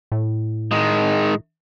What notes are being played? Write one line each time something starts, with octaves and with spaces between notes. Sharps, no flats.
A2
D#3 G#3